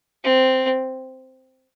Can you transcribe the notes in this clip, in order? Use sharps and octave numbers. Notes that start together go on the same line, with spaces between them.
C4